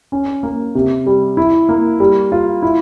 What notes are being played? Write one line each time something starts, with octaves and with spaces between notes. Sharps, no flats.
C#4
A#3
C3
G3
E4
A#3
G3
F4
E4